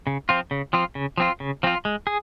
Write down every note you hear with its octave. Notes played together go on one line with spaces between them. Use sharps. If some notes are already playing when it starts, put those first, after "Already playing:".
C#3
F3 C4 F4
C#3
F3 C4 F4
C#3
F3 C4 F4
C#3
F3 C4 F4
G#3
G#4